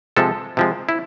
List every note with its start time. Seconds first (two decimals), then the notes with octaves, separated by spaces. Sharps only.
0.17 C3 F3 G#3 A4
0.57 C3 F3 G#3
0.89 E4